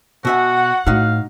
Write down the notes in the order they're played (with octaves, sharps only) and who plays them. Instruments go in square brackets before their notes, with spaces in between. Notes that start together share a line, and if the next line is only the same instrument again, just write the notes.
[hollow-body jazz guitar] B2 E5 G#5 [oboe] F#4 [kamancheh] F#5
[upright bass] A2 [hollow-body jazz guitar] D#4 F#4 [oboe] F5